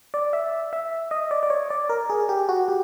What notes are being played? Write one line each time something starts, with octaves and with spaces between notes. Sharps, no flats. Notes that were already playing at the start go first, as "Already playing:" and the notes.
D5
E5
E5
D#5
D5
D5
C#5
D5
A#4
G#4
G4
F#4
G4